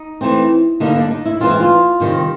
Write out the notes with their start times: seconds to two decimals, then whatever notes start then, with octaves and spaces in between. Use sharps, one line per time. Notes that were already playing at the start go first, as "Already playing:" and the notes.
Already playing: D#4
0.21 E3 A3 C4
0.80 D3 G3 A#3 D#4
0.95 D4
1.11 D#4
1.25 E4
1.40 E3 G#3 C4 F4
1.50 E4
1.60 F4
2.00 C3 D#3 G3